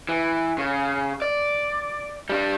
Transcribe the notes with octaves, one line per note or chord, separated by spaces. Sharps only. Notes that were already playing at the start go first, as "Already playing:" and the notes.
E3
C#3
D5
G3 D4